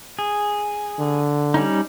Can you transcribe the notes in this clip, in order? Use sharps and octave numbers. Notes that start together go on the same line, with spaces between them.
G#4
D3
G3 C#4 D#4